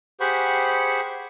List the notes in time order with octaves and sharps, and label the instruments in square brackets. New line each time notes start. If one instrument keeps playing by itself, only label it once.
[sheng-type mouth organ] G4 G#4 C5 F#5 B5 C#6